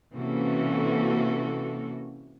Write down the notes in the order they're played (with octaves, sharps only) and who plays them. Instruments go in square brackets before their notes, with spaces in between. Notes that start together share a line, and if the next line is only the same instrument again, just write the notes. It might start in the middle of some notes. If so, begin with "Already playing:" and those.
[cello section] C3 E3 A#3 C#4 F#4 A4